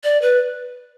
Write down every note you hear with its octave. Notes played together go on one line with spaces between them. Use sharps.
D5
B4